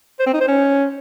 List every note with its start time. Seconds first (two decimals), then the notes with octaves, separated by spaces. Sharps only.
0.19 C5
0.26 C4
0.33 D#4
0.40 C5
0.48 C#4